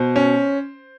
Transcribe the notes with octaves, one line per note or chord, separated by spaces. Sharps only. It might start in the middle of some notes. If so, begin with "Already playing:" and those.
Already playing: B2 C5
C#4